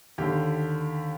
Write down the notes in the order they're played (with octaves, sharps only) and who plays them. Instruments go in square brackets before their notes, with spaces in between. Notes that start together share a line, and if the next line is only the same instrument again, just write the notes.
[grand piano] D#2 D3 G4